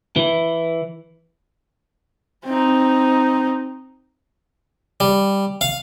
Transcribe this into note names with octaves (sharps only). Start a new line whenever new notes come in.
E3
C4 D#4
G3
F5